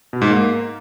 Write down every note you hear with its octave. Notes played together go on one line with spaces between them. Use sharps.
B2
G#2
A#3